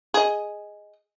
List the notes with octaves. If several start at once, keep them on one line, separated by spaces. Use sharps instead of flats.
G#4 D#5